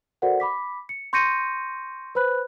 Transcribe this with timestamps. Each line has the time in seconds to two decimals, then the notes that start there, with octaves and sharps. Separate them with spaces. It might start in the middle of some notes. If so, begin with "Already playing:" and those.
0.22 F#4 A4 A#4 C5 D5 F#5
0.40 B5 D6 B6
0.89 C#7
1.13 C6 C#6 G6 A#6 C#7 D#7
2.15 B4 C5 B5 F#6